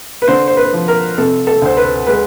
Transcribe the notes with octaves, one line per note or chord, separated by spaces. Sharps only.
B4
D3 C5
C5
B4
F3
A#4
C3 A4
A4
D2 C5
B4
G#3 B4